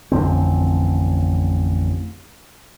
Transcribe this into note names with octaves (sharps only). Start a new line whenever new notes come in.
A1 F2 D3 C4